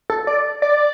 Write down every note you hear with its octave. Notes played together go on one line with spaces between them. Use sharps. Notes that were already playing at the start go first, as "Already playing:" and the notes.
A4
D5
D5